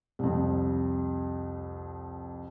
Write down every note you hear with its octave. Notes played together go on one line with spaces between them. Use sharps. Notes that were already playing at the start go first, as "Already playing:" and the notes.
C2 F2